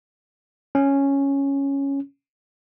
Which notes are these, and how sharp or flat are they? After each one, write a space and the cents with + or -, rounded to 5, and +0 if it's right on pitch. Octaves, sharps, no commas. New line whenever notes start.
C#4 +0